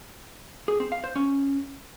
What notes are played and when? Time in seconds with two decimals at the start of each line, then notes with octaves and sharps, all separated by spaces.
0.68 G#4
0.80 C4
0.92 F5
1.04 C5
1.15 C#4